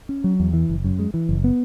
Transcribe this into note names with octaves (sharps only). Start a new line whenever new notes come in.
C#4
F#3
E2
E3
F#1
F#2
G#3
E3
F#1
B3